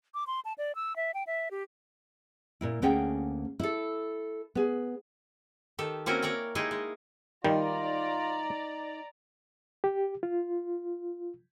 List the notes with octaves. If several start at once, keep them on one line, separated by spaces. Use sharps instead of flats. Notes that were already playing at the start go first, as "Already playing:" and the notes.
D6
C6
A5
D5
E6
E5
G5
E5
G4
A#2 A#3 E4
D2 A#3 C#4 G#4 F#5 G5
E4 A4
B3 G#4
D#3 G4 A4
A#3 C4 C#4 E4 F#4 A#4
A#4 C#5 D5 G5
G#3 A#3 D#4 E4 G4 G#4
G#3
D#3 G3 D#4 F4 D5 G5 A#5
G4
F4